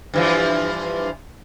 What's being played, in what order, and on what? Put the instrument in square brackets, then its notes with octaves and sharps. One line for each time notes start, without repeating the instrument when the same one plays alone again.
[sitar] G2 E3 F3